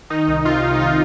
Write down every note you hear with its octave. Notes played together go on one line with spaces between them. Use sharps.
D#3 D#4
C2
C3 F4
C2
D#4
D#3 F4